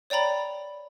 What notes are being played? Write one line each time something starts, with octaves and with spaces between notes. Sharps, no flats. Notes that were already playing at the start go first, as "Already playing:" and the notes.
C#5 D5 G5 A#5 B5